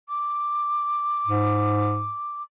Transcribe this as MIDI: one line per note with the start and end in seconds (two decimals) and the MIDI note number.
0.09 2.43 86
1.27 2.12 44